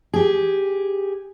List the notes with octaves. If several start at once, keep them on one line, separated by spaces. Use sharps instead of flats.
G4 G#4